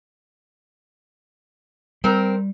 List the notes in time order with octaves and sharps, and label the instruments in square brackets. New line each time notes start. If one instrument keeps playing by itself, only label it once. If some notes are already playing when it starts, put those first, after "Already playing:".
[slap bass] G3 [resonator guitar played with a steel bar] C4 A#4